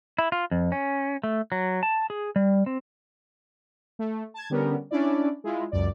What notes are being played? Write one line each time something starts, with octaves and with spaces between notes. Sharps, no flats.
E4
F4
F2
C#4
A3
F#3
A5
G#4
G3
C4
A3
A5 G#6
D3 G3 B3 C#4 A#4
C#4 D4 E4 D5
G#3 E4 F4
C#2 F#2 D5